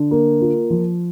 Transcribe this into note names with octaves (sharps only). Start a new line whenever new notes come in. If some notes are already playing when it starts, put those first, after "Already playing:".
Already playing: D3
A#3
F4
F3